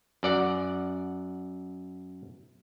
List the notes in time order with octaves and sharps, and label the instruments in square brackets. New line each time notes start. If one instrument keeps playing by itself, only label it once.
[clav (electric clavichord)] F#2 D5 F#5